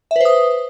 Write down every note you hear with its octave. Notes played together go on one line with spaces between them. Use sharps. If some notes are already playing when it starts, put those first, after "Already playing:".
B4 C5 E5 D#6